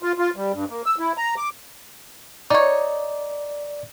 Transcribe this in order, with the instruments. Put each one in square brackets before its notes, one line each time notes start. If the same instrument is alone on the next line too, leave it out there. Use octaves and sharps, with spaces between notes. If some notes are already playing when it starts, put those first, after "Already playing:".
[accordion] F4
F4
G3
G2
A#3
E6
E4
A#5
D6
[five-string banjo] D#4 C#5 [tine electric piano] D5